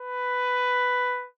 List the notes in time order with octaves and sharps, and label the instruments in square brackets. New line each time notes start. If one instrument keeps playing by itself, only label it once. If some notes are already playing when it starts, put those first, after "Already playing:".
Already playing: [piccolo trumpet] B4